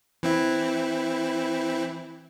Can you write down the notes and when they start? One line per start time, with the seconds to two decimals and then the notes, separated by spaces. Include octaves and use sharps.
0.23 E3 C4 E4